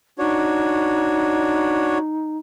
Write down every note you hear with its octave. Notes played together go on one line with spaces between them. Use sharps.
D4 D#4 F#4 C#5